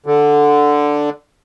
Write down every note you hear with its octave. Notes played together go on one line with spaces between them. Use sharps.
D3